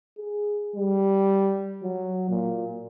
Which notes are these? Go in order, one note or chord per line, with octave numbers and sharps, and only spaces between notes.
G#4
G3
F#3
A#2